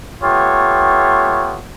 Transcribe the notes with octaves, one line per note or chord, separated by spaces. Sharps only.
A3 B3 F4 G4 C#5